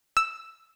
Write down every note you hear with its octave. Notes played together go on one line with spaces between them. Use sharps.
E6